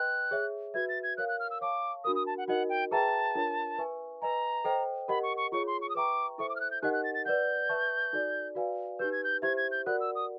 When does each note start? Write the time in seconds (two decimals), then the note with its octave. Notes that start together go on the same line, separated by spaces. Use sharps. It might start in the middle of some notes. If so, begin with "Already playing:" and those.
Already playing: B4 D#5 G5 C6 F#6
0.31 G#4 C#5 E5
0.74 F#4 B4 E5 G#6
0.89 A6
1.03 G#6
1.17 A#4 C#5 F5 F#6
1.28 F#6
1.40 F6
1.50 E6
1.61 C#5 F5 A5 C#6 D6
2.04 D4 F#4 A#4 D#6
2.15 D#6
2.26 A5
2.37 F#5
2.48 D#4 F#4 A#4 D#5 F#5
2.69 G5
2.91 G#4 B4 E5 G5 A5 A#5
3.35 D4 F4 A#4 C#5
3.78 B4 E5 G#5 C#6
4.22 B4 D#5 G#5 A#5
4.64 A4 C5 D#5 G5
5.08 G4 A#4 D#5 F#5 B5
5.23 C#6
5.37 C#6
5.52 F4 G#4 C#5 C#6
5.67 C6
5.81 C#6
5.89 D#6
5.95 B4 E5 G5 A#5 C#6 D6
6.38 E4 A4 C5 E5 C#6
6.49 D6
6.56 F6
6.60 F#6
6.71 G6
6.82 D#4 G4 A#4 D#5 F#5 F#6
6.93 F#6
7.04 A6
7.14 A6
7.25 B4 D5 F#5 G6
7.69 B4 E5 A5 C#6
8.13 D#4 F#4 A4 D5
8.55 F#4 B4 D5 F5 G#5
8.99 D#4 G4 B4 G6
9.12 G#6
9.24 G6
9.42 E4 G4 C5 E5 G#6
9.57 G#6
9.71 G6
9.86 F#4 A#4 D5 F#5 F#6
10.00 E6
10.15 D#6